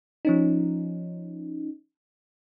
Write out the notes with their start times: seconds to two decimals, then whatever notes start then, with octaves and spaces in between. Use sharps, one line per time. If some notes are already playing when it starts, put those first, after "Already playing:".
0.25 F3 C#4 D#4